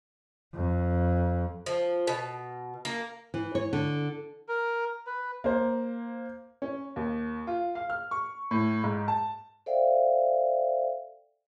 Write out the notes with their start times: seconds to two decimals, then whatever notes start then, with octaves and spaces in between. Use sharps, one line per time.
0.53 F2
1.66 F3
2.07 B2
2.85 A#3
3.34 E3
3.55 C#5
3.73 D3
4.48 A#4
5.06 B4
5.44 A#3 C5
6.62 C#4
6.96 D#2
7.47 F4
7.75 F5
7.90 F6
8.11 C#6
8.51 A2
8.84 G#2
9.08 A5
9.66 A4 C5 D5 E5 F5 G5